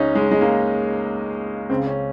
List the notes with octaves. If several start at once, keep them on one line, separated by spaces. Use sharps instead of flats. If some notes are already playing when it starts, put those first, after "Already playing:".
Already playing: C#2 C#3 C#4 D#4
G#3
G#3
A#3
C#2 C#3 C4
C#4